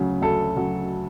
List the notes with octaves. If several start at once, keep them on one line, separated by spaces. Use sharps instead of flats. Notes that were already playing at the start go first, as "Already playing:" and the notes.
Already playing: D2 C#3 F#3
D2 A4
C#3 F#3